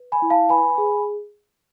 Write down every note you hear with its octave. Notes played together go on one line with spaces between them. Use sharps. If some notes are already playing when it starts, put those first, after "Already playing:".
Already playing: B4
G#5 B5
E4
F5 A5
B4 G#5 B5
G#4